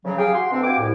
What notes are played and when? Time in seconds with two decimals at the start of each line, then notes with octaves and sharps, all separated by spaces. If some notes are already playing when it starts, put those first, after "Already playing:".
0.05 C#3 F#3
0.18 G4 G#4 F5 G5
0.33 F#4 C6
0.51 D2 B2 C4 D4
0.64 F#4 G4 F5 G5 G#5 D6
0.78 C2 A2